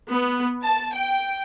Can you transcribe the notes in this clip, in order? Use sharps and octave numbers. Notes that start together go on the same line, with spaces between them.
B3
A5
G5